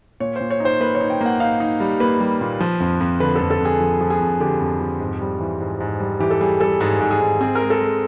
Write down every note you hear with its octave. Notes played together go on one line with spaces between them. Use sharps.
A#2 C#5
A#2 C5
C#5
D#4 C5
A#3 B4
C#5
D#4
G5
A#3 F#5
D#4 F5
D#4
G3
A#3 B4
G3
A#2
F3
F2
F2
D3 B4
A4
F2
A4
F2 G#4
F3
F3
G#4
F2
D3 G4
F2
F3
G#2
G3
E3
G#2
G#2
G3
E3 G4
A4
G3 G#4
G3 A4
G#2 G#4
G#2
G#4
G#2
C4 G#4
A#4
G#3
A4
G#3